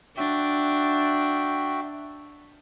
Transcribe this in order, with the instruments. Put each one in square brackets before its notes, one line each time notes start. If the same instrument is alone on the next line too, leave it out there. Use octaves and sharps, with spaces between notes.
[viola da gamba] D4 [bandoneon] F#4 E5 G5